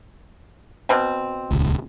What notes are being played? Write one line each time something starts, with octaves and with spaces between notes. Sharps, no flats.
B2 C4
D#1 C#2